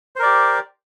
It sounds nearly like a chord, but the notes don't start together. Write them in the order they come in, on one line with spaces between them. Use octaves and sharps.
C5 A#4 D5 G4